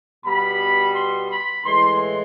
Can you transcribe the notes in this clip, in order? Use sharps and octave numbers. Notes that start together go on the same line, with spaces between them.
B2 G3 B3 B5
C6
B5
A2 E3 G#3 C6